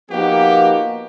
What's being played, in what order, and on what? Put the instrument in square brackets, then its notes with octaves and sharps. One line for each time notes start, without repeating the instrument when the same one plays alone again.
[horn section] F3 A#3 B3 D#4 F#4 G4